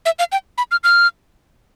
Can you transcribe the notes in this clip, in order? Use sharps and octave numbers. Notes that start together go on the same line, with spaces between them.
E5
F5
G5
B5
F6
F6